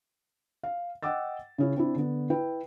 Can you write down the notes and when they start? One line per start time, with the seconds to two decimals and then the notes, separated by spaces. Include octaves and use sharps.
0.63 F5
1.03 D#5 F#5 G5 D6 E6 A6
1.58 C#3 C#4 E4
1.76 C4 D4 E4
1.95 D3 B3
2.30 E4 B4 G5